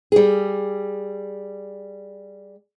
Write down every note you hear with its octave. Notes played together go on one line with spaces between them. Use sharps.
G3 G#4